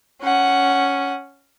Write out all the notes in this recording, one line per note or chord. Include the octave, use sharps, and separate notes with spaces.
C#4 F#5